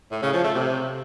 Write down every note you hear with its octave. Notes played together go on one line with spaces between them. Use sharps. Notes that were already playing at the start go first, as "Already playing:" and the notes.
A2
C#3
F3
A3
C3